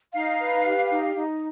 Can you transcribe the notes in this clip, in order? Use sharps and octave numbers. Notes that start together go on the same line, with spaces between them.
D#4 F5
B4
G4
D#4
D#4